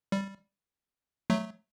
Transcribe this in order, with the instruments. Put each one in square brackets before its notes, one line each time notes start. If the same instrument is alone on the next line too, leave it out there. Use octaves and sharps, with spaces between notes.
[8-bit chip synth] G3
F#3 A3